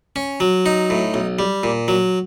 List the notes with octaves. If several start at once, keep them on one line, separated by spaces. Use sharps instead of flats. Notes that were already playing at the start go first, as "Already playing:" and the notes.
C#4
F#3
D#4
A2
B1
G3
A#2
F#3